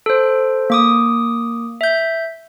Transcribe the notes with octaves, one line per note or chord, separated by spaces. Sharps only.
A4 C5
A#3 D6 D#6
E5 G6